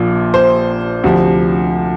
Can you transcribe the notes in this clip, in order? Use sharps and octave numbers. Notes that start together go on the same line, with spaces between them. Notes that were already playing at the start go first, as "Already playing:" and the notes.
Already playing: A#1 A#2 F3
C5
D2 C3 F3